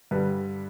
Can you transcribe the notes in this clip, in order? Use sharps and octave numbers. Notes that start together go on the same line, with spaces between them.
G2 D3 G3 B4